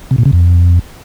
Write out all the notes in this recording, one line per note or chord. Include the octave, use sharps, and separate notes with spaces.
C3
A#2
C#3
F2